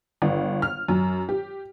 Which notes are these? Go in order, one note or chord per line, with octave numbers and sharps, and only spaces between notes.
G1
F6
F#2
G4